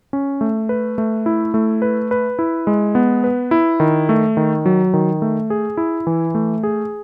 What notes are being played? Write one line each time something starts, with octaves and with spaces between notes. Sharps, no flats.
C#4
A3
B4
A3
E4
A3
B4
B4
E4
G#3
B3
B4
E4
D#3
A3
D#3
F#3
D#3
A3
G#4
E4
E3
A3
G#4